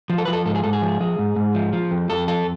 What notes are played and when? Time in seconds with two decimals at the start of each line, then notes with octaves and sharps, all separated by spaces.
0.10 F3
0.18 A4
0.25 F3 B4
0.33 A4
0.46 G#2 A4
0.55 G#4
0.64 G#2 A4
0.73 G#4
0.82 F3
1.00 F3 G#4
1.19 G#2
1.36 G#2
1.55 F3
1.73 F3
1.91 F2
2.09 F2 A4
2.28 F3 A4